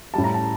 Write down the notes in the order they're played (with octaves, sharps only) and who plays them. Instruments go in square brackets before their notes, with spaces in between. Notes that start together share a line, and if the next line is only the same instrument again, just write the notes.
[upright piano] A2 G3 A5
A#5
A5